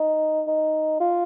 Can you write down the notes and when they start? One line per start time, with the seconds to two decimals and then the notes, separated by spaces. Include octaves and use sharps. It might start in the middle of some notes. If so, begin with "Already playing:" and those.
Already playing: D#4
0.47 D#4
1.00 F4